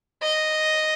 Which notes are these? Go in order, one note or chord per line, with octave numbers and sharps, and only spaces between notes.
D#5